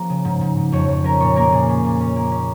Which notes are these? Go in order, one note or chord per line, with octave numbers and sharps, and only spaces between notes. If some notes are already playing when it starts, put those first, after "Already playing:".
Already playing: F3 A#3 C#4 G#4 A#4
C#3
G#2
G#2
G#2
F2 C#5
F2 C#5
C#4 A#4
A#2 C#5
A#3 A#4
A#2 G#4
C#4
A#2
C#4
A#3
C#4